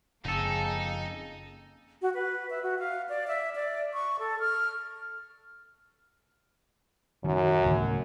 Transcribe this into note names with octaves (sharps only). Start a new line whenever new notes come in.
F#1 F2 C#3 A#3 D#4 G#4 A4
F#4
B4
E5
F#4
F5
D5
E5
D5
C#6
A4
F6
F#2 D#3 F#3 G3
D1 E2 C#3